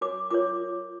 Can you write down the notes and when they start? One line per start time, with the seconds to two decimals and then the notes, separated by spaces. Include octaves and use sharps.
0.01 F#4 A#4 C#5 D6
0.31 F4 A#4 C#5 D6